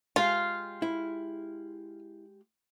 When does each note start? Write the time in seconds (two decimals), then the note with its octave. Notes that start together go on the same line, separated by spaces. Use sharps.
0.16 G#3 F4 G4 F5
0.82 E4